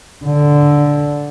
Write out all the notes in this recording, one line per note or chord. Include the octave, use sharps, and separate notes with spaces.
D3